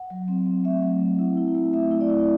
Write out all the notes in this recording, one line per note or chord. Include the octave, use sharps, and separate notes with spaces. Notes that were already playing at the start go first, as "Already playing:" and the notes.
Already playing: F#5
F#3
C4
C4
A3 E5
F#3
C4
E4
E4
A3
A3 E5
E4
D5
E4